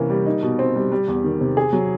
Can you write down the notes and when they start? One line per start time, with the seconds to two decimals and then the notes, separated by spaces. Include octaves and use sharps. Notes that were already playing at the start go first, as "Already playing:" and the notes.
Already playing: C3 E3 A#3 C#4
0.10 G3
0.26 D#4
0.43 B2
0.59 C4
0.76 G3
0.92 G3
1.08 E2
1.24 D#3
1.40 C3
1.57 G#4
1.73 F#3